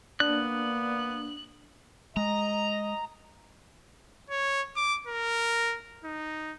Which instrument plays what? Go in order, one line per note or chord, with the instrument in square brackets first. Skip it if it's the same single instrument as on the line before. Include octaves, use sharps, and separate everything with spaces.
[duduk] A#3 [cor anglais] B3 [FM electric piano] D4 [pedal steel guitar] F#6
[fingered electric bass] G#3 [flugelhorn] D#5 [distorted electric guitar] A#5
[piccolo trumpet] C#5
D6
A#4
D#4